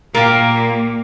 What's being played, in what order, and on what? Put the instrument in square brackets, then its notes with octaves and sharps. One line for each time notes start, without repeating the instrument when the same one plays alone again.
[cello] A#2 [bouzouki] A#3 [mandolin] F4 G4